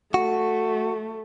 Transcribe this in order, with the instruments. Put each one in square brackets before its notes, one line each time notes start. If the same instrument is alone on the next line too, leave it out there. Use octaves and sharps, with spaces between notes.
[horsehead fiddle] A3 [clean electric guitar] F#4